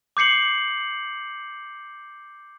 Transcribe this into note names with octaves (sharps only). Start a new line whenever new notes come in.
D6 G6 C7 C#7 F#7